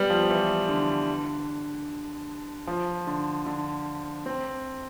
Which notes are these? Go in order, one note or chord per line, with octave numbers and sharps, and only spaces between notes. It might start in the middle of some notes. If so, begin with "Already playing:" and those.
Already playing: G3 B3
F3
E3
D3
F3
D3
D3
C4